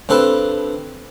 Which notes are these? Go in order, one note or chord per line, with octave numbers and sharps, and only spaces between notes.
G2 C4 A4 B4 A5